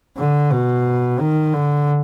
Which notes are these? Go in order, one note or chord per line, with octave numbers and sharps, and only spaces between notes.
D3
B2
D#3
D3